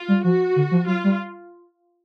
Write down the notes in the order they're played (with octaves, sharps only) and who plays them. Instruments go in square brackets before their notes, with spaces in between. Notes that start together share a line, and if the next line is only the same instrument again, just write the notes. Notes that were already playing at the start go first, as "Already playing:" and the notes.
Already playing: [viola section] F4
[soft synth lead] G3
[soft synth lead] F3 [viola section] F#4
[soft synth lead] D3
F3
[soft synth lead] F#3 [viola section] F4
[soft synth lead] G3